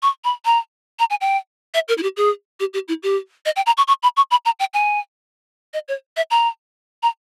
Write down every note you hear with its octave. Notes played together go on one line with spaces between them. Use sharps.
C#6
B5
A#5
A#5
G#5
G5
E5
A#4
E4
G4
G#4
G4
G4
E4
G4
D#5
G5
A#5
C#6
C#6
B5
C#6
B5
A#5
G5
G#5
D#5
C#5
E5
A#5
A#5